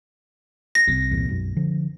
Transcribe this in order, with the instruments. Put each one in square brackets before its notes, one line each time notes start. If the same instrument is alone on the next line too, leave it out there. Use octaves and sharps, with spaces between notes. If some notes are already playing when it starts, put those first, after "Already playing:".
[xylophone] A#6
[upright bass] C2 C#4
[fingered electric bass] E2 A#2
[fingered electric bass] B1 F#2 [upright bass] G#3
[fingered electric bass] D3 F3